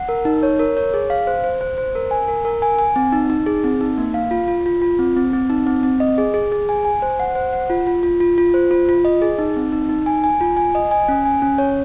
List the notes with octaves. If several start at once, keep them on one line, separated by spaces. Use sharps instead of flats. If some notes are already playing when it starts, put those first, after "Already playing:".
Already playing: F#5
A#4
D#4
C#5
A#4
C#5
G#4
F5
C5
C5
C5
C5
A#4
G#5
A#4
A#4
G#5
G#5
C4
D#4
D#4
G#4
C4
D#4
A#3
F5
F4
F4
F4
F4
C4
C4
C4
D#4
C4
C4
D#5
G#4
G#4
G#4
G#5
G#5
C5
F#5
C5
F#5
F4
F4
F4
F4
F4
C5
F4
F4
D#5
G#4
D#4
C4
D#4
D#4
G#5
G#5
F4
G#5
D#5
G#5
C#4
G#5
C#4
C#5